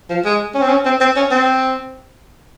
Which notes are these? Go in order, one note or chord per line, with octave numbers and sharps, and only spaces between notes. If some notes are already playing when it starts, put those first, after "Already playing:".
F3
G#3
C#4
C4
C#4
C4
C4
C#4
C4